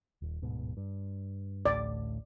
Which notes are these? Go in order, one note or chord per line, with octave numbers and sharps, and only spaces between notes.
D#1
D1 G#2 B2
G2
A1 D2 A2 D5